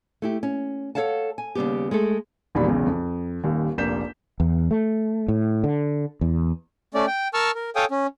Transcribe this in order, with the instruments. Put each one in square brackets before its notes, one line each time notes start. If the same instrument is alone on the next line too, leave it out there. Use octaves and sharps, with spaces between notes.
[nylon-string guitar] A3 E4 G4
C#4
A4 C#5 F5 F#5 A5
G#5
D#2 C#3 G3 B3 G4
G#3 A3 A4
[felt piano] E1 A#1 A#2 D#3 G3 B5
B1 E2 C#3
F2
D#1 D#2
F1 A#1 A#3 G6 B6 E7
[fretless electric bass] E2
A3
A2
D3
E2
[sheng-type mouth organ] A3 C#4 D5
G5
A#4 A5 C#6 E6 F6
A#4
A4 C#5 F5 G5 G#5 D#6
C#4